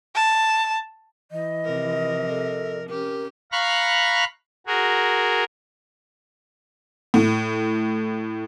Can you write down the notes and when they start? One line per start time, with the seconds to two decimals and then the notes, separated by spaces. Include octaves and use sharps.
0.15 A5
1.32 E3 D#5
1.65 C3 F3 A#4
2.29 A4
2.89 C#4 G4 A#4
3.52 F5 A#5 B5 C#6 F6 F#6
4.67 F#4 G#4 A#4
7.14 A2